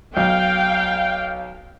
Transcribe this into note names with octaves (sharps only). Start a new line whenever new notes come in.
B1 F5 G5